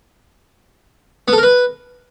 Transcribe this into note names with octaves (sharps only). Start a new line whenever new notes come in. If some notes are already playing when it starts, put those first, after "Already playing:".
B3
A4
A#4
B4